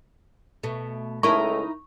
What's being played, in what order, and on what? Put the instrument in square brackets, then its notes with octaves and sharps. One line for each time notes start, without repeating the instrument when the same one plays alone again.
[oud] B2 A3
[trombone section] C#2 A3 [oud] D#4 E4 A#4 [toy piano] C#6